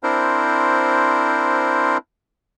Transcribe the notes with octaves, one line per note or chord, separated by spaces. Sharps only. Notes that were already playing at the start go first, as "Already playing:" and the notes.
C4 D4 E4 A#4 C5